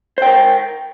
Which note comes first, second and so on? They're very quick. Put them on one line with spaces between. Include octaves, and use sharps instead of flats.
C5 G5 A#4